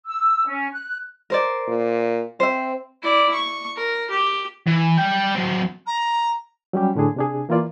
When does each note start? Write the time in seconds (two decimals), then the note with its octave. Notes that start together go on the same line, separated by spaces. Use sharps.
0.06 E6
0.47 C#4
0.73 F#6
1.30 A#4 C5 D5
1.67 A#2
2.40 C4 C5 E5
3.03 E4 D5
3.34 C#6
3.76 A#4
4.10 G4
4.67 E3
4.98 G3 G5
5.36 F#3 C4
5.86 A#5
6.73 F#3 G3 C#4 G4
6.95 A2 D3 D4 G#4
7.16 C3 D4 G#4
7.49 E3 A#3 E4 F4 D5